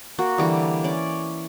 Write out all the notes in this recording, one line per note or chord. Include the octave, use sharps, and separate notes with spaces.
A#3 F#4
D3 E3 G3
C#4 D5